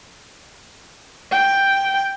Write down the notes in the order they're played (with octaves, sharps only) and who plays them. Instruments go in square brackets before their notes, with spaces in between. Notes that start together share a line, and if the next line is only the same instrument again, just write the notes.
[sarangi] G5